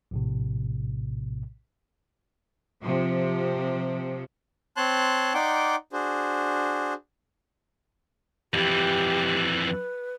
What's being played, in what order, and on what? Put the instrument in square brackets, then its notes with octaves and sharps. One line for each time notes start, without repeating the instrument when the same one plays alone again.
[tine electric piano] A#1 A2 C3
[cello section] C3 F3
[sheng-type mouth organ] C4 C#5 A5 C6 F#6
D#4 D5 F#5 G5 C6 D6
D4 F#4 G#4 C5
[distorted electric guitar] F2 E3 [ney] G4
[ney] B4